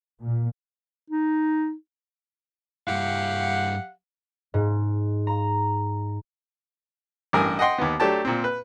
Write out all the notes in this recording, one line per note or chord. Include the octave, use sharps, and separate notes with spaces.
A#2
D#4
G2 E4 G4 F5 F#5
G#2
A#5
A1 G2 A#4 G#5
D#5 F#5 G5 C6
D#2 B3
F#3 A3 D4 G4 A5
A#2 C4
B4